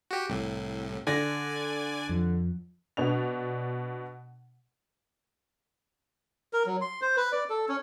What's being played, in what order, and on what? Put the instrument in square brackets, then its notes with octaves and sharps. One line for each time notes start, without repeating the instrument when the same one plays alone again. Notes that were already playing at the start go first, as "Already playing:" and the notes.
[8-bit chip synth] F#4 G4
C2 A2
[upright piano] D3 A#6 [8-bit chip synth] D5 G#5
[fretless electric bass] F2 F3
[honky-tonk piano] B2 D4 F7
[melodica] A#4
F#3
C6
C5
B4
D5
A4
C#4